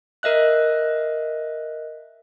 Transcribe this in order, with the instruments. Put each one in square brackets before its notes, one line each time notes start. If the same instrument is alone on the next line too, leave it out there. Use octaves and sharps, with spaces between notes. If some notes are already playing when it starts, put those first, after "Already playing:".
[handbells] A#4 D#5 E5 F#6